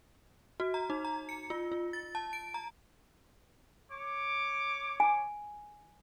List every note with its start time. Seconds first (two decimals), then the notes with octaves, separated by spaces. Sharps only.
0.60 F#4
0.74 A#5
0.90 D#4
1.05 A#5
1.29 C#7
1.50 F4
1.72 F4
1.93 A6
2.15 A5
2.33 D7
2.54 A#5
3.92 C#5 D6
5.00 G#5